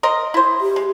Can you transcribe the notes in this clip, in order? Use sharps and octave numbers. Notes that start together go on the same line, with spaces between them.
A#4 C5 D#5
E4 C5
G4
G#3